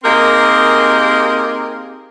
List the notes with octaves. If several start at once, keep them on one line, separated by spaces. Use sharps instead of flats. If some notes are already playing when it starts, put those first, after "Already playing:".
A#3 C4 D#4 G4 G#4 A#4